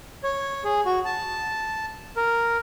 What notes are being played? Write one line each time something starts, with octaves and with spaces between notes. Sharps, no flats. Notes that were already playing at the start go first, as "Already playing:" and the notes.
C#5
G#4
F#4
A5
A#4